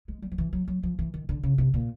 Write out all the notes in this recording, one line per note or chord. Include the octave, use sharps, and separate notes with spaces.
G#3
G3
F3
E3
F#3
F#3
F3
E3
D#3
D3
C#3
C3
A#2